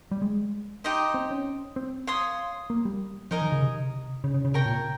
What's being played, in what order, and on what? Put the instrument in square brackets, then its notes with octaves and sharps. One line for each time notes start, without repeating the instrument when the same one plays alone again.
[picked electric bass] G3
G#3
[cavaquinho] D#4 G4 C5 D#5
[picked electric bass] C4
C#4
C4
[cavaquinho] C#5 F5 C6 D#6
[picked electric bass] A#3
G3
[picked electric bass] F3 [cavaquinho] D#4 A#4 D#5 G#5
[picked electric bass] D#3
C#3
C3
C#3
C#3
C#3
[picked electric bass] C3 [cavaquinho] A#4 C#5 G5 A#5
[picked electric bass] A#2